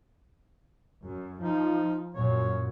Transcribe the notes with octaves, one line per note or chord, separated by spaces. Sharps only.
F#2
F3 D#4
F#2 A#2 C#5